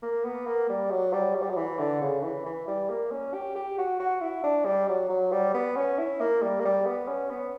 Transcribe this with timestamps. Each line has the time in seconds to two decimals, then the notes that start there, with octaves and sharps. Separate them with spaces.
0.02 A#3
0.25 B3
0.46 A#3
0.69 G3
0.91 F#3
1.13 G3
1.35 F#3
1.42 G3
1.50 F#3
1.57 E3
1.78 D3
2.01 C#3
2.23 E3
2.45 E3
2.67 G3
2.90 A#3
3.11 C#4
3.34 G4
3.56 G4
3.78 F#4
4.00 F#4
4.21 E4
4.43 D4
4.65 G3
4.88 F#3
5.09 F#3
5.32 G3
5.54 B3
5.76 C#4
5.98 E4
6.20 A#3
6.42 G3
6.60 A#3
6.65 G3
6.86 B3
7.08 C#4
7.30 B3